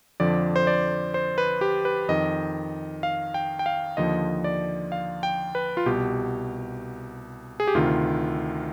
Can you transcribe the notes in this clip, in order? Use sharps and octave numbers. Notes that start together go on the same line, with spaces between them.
F2 D3 F3 D5
C5
D5
C5
B4
G4
B4
F2 D#3 D#5
F5
G5
G5
F5
D#2 D3 F3 D#5
D5
F5
G5
B4
F4
C2 B2 G4
G#4
G4
D2 C3 D#3 F4